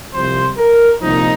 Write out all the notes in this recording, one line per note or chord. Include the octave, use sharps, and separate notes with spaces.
C2 C3 F3 C5
A#4
C2 A#2 F3 D#4